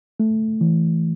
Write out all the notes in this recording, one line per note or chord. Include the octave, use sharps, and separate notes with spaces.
A3
E3